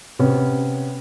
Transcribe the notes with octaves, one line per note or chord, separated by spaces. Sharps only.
C3 B3 C#4